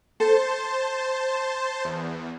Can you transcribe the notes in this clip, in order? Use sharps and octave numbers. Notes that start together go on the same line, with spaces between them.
A4 C5 A5
E2